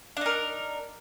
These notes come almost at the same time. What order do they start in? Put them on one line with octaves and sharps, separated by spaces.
D4 D#4 A#4